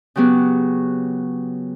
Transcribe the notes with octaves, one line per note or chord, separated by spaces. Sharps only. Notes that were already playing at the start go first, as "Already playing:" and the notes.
C#3 F#3 B3 G4